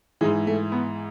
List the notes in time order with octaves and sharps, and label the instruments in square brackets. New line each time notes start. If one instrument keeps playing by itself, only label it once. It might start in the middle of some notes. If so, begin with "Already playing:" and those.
[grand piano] G#2 E3 G#3
A3
B3